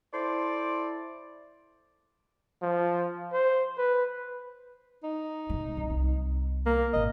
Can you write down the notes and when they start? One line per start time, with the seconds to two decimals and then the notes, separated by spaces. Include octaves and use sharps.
0.13 E4 A4 C5 D5
2.62 F3
3.33 C5
3.78 B4
5.03 D#4
5.50 C3 G#3
5.77 C2
5.90 C2
6.66 A#3
6.93 G#1 C3 D#5